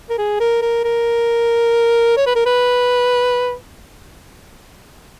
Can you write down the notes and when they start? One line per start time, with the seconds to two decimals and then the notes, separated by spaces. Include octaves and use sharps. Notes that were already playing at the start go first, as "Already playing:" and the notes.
0.09 A#4
0.18 G#4
0.40 A#4
0.62 A#4
0.84 A#4
2.16 C#5
2.26 B4
2.35 A#4
2.46 B4